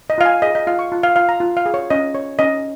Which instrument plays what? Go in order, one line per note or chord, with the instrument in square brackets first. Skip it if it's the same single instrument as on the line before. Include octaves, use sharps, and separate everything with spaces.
[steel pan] D#5
F4 F5
G#5
G#4 D#5
D#5
F4 F5
C#6
F4
F5
F4 F5
A#5
F4
F5
G#4
C#5
C#4 D#5
C#5
C#4 D#5